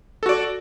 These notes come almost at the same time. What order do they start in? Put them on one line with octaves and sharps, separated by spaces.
A4 F#4 D5